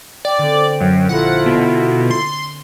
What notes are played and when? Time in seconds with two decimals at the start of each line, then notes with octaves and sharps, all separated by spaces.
0.25 D5 G5
0.38 D3 C4
0.81 F#2
1.09 A#1 E4 F4 A4 B4 F#5 A#5
1.46 B2 E6 B6 D7
2.11 C6 A6